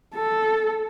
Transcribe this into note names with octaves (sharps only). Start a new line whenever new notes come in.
A4